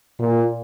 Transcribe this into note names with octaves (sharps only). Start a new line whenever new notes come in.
A#2